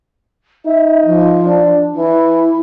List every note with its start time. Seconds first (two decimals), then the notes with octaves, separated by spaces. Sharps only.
0.66 D#4 E5
1.06 F3
1.46 D4
1.96 E3 E4